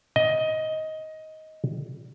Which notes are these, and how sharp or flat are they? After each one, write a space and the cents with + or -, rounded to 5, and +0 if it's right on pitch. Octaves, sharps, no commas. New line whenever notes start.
D#5 +15